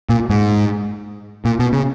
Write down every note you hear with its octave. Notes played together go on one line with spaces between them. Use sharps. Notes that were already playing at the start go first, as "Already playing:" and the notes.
A#2
G#2
A#2
B2
C#3